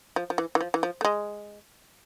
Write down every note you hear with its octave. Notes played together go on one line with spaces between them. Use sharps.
F3
F3
E3
E3
F3
E3
F3
A3
G#3